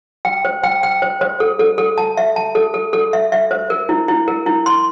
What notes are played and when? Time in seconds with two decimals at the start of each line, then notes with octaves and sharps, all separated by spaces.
0.25 G5
0.45 C5
0.63 G5
0.83 G5
1.02 C5
1.21 C5
1.40 A4
1.59 A4
1.78 A4
1.98 A5
2.17 E5
2.36 A5
2.55 A4
2.74 A4
2.93 A4
3.13 E5
3.32 E5
3.51 C5
3.70 A#4
3.89 E4
4.08 E4
4.28 A#4
4.46 E4
4.66 C6